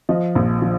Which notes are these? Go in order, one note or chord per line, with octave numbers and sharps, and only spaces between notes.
F3 D#5
A#1
F3